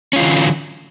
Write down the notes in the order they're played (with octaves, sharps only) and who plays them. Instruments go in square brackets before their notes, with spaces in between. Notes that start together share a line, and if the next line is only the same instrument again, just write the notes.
[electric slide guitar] C#4
F4
E3
D3
F#3